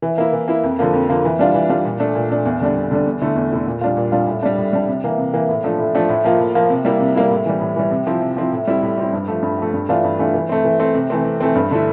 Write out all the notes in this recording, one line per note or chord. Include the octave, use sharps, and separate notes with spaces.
E3
A#3 E4
E3
A#3 E4
F2
D3 F3 A#3
F2
D3 F3 A#3
E3
G3 D4 F4
E3
G3 D4 F4
A#2
A3 D4
A#2
A3 D4
E2
D3 G3 D4
E2
D3 G3 D4
E2
D3 A3 E4
E2
D3 A3 E4
A#2
G3 D4 F4
A#2
G3 D4 F4
A2
G3 D4
A2
G3 D4
C3
E3 A#3
C3
E3 A#3
A2
F3 A3 D4
A2
F3 A3 D4
A2
F3 A#3 F4
A2
F3 A#3 F4
C3
G3 A#3 E4
C3
G3 A#3 E4
A2
E3 G3
A2
E3 G3
C3
F3 C4 E4
C3
F3 C4 E4
A2
G3 C4 E4
A2
G3 C4 E4
G2
F3 A3
G2
F3 A3
G2
E3 A3 D4 F4
G2
E3 A3 D4 F4
E3
A3 C4
E3
A3 C4
C3
E3 A3 C4
C3
E3 A3 C4
G2
D3 A3 E4